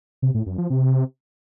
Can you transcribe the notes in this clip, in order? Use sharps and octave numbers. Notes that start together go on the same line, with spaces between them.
C3
A2
F#2
F3
C3